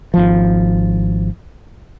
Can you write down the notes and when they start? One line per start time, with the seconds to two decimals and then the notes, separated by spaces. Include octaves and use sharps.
0.14 G#1 F3